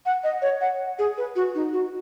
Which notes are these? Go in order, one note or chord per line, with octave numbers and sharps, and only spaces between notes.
F#5
D#5
C#5
F#5
G#4
B4
F#4
D#4
F#4